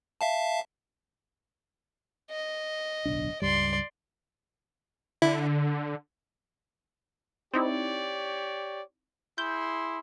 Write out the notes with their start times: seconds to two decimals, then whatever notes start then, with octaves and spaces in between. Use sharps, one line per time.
0.21 E5 F5 A5
2.31 D#5
3.05 D1 B1 D4
3.42 C#2 G2 G3 D5 C6
5.22 D3 E4
7.54 C4 D#4 E4 G4 C#5 D5
9.38 E4 G#4 C6 G6